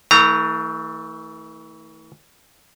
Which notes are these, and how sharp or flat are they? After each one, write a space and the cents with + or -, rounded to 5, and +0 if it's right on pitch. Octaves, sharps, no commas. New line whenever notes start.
E3 -40 A3 +15 A#5 -15